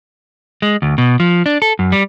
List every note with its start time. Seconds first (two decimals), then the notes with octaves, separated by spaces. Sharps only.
0.62 G#3
0.82 D2
0.98 B2
1.20 F3
1.46 D4
1.62 A4
1.79 F#2
1.92 G3